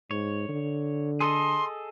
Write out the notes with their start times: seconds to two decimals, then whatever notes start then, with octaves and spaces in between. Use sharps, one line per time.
0.11 G#2 C#5
0.49 D3
1.20 G#4 A4 D#5 C6